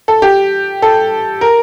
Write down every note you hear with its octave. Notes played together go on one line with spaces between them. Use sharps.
A4
G4
A4
A#4